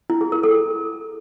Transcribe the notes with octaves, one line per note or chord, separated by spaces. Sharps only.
E4
G#4
A#4
A4